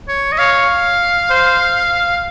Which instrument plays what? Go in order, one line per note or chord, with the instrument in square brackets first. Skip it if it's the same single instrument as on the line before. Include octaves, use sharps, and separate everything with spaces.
[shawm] C#5
D#5
[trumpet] C#5 [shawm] F5
[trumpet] C5